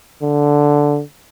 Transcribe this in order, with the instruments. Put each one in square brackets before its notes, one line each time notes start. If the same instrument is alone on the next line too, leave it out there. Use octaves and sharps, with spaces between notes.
[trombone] D3